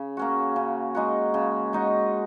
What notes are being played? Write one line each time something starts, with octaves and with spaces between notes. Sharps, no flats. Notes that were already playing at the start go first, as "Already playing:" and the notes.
Already playing: C#3
A#3 C#4 F#4
C#3
G#3 D#4 F#4
C#3
G#3 D#4 F#4